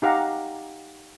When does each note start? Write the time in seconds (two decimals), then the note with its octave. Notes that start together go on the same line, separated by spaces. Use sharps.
0.02 D#4 G4 F5 F#5 A#5